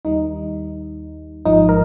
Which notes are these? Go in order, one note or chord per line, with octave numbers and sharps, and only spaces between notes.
D#2 D#3 G3 D#4
G#1 G#2 F3 D#4
A#4